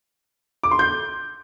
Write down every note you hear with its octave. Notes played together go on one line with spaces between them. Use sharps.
D6
C6
G6